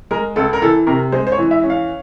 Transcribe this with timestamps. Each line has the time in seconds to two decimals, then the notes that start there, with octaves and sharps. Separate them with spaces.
0.11 G#3 A#4
0.36 C#2 A4
0.53 A#4
0.62 E3 A4
0.87 C3 A#4
1.12 G#3 C5
1.27 C5
1.32 C#5
1.38 E3
1.51 E5
1.63 C#4
1.70 F5